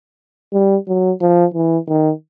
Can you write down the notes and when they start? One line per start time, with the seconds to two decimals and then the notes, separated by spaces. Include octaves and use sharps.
0.53 G3
0.88 F#3
1.21 F3
1.54 E3
1.88 D#3